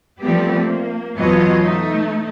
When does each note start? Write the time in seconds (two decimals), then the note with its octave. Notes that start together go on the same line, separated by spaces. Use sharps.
0.21 F3 G3 A3 B3 C4 G4
0.60 A#3
1.18 E2 B2 F#3 F4 C#5 D#5
1.64 A3 D#4